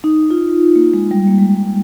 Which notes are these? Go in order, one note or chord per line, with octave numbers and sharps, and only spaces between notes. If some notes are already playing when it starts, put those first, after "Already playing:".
D#4
F4
A#3
G#3
G3
A#3
G#3